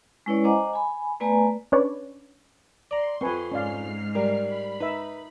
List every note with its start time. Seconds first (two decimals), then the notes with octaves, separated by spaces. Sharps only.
0.26 G#3 C#4 E4 B4 C#5 D5
0.44 C5 D#5 F#5 G#5 A#5 D6
0.73 G#5 B5
1.20 A3 B3 B4 D5 G#5 A#5
1.72 C#4 D4 B4 C#5 D5
2.91 D5 A#5 C6
3.21 F2 C4 B4 G#5 C#6
3.51 G#2 C#4 D5 F5 F6 C7
4.15 G3 A#4
4.46 B5
4.81 D#4 B4 E5